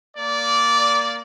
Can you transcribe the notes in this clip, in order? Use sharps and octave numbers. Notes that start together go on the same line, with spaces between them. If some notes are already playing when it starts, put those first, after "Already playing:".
A#3 D5